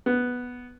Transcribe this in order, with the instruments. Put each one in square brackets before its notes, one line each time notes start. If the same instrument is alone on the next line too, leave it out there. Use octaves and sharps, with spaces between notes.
[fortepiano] B3